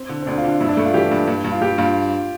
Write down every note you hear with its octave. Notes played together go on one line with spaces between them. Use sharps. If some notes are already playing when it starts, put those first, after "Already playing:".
Already playing: C4
D3
C4
D2 D4
F4
D3
F4
G2 E4
D4
G2 A3
F4
E3 G4
G2
G2
G2
F4
G2 G4
G2 F4